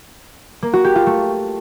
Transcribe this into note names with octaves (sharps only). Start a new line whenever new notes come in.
A#3
F#4
G4
F4
A3